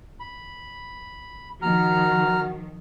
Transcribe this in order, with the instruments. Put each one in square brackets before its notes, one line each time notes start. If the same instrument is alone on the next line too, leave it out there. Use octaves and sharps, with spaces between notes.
[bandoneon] B5
[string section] D#3 F3 [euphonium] F#4 [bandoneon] A#5 F6